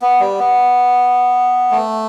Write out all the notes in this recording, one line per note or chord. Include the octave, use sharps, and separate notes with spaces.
B3
G3
B3
A3